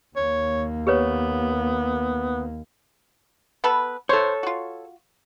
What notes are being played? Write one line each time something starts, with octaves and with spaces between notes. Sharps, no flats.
D#2 A#3 C#5
B3 G4 B4 C#5
B3 A4 B4
A4 C5 C#5
F4 F#4